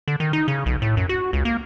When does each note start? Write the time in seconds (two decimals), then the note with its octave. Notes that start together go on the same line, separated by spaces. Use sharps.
0.08 D3
0.20 D#3
0.33 D#4
0.48 C#3
0.66 B1
0.82 A2
0.97 F#2
1.09 F#4
1.33 C#2
1.45 A#3